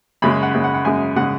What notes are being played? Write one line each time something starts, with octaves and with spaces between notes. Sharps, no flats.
F#2 C#3 G#3 B5
F#5
F#2 C#3 G#3
F#5
F#5
F#2 C#3 G#3 G#5
C#3 G#3 F#5